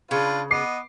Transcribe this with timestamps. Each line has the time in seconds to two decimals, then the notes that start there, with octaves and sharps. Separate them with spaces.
0.11 C#3 D4 F4 B4
0.51 B3 D#5 D6 C7